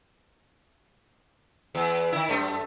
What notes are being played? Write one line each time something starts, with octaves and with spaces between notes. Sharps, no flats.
E2
D#3 E4
F#2 A3